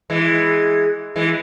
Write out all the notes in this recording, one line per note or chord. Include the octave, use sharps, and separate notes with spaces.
E3 G#3
E3 G#3